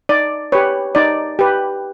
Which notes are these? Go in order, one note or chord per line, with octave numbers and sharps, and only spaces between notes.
D#4 D5
G4 B4 C#5
D#4 D5
G4 B4